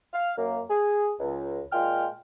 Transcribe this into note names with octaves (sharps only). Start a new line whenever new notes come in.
F5
F#2 A#3
G#4
C#2
A#2 G#3 F4 G5 F6